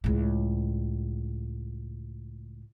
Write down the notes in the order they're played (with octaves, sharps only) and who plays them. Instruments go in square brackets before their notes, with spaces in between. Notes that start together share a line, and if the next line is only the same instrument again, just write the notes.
[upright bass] C#2 A2